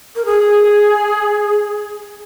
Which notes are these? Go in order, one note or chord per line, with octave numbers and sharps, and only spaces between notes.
A#4
G#4